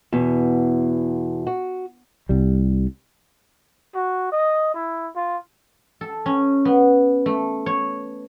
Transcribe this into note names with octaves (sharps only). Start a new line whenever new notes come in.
E2 B2
F#4
C2 G3
F#4
D#5
E4
F4
A4
C#4
B3
A3
C#5